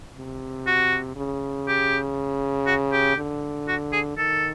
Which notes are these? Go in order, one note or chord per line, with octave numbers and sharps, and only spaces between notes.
C3
F#4
C#3
G4
F#4
G4
D3
F#4
G#4
D#3 A4